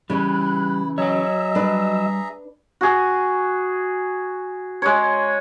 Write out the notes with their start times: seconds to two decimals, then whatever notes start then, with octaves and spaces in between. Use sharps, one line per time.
0.10 C#3 E3 G3 E4 F#6
0.98 F#3 G#4 C#5 D#5 E5 F#5 A#5 E6
1.55 G3 D4 B4
2.81 F#4 G#4
4.82 G#3 C#5